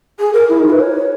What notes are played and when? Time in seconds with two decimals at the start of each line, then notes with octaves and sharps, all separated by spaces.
0.18 G#4
0.33 A#4
0.48 E4
0.59 D#4
0.69 B4
0.79 C#5